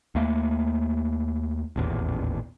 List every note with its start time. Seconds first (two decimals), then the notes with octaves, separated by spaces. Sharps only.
0.15 D#2 A3 A#3
1.76 D#1 A1 E2